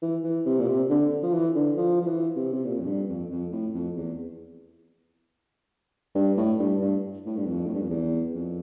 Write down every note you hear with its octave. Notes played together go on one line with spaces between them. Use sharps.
E3
E3
C3
A#2
C3
D3
F3
E3
D3
F3
F3
E3
C3
C3
A#2
F2
G2
F2
F2
A2
F2
E2
G2
A2
G2
G2
A2
G2
F2
A2
G2
F2
E2
F2